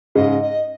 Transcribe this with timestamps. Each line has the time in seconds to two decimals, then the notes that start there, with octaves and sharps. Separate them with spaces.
0.15 G#2 C#3 D#5
0.42 D#5